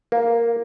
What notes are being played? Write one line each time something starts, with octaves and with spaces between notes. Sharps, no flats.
A#3